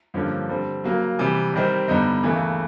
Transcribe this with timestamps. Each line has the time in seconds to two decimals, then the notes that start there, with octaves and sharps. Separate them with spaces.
0.14 G2 D3 F3 A#3 C#4
0.49 D3 G3 C4
0.84 C#3 F#3 A#3
1.19 C3 E3 G3
1.54 C3 D#3 G3 C4
1.88 G2 D3 G3 B3 D#4
2.23 D#2 C#3 E3 A3